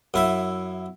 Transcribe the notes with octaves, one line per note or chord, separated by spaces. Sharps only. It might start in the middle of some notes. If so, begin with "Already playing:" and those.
F#2 E4 E5